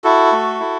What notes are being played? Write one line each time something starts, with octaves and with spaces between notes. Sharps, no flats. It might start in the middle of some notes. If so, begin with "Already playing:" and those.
E4 F#4 A4
A3
E4